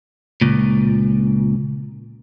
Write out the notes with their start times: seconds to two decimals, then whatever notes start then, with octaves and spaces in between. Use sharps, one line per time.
0.41 C#2 A#2